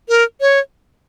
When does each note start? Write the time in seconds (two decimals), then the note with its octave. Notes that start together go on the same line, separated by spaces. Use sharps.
0.09 A#4
0.41 C#5